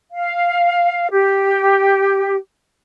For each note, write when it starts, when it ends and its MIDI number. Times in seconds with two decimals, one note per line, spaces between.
0.12 1.07 77
1.12 2.37 67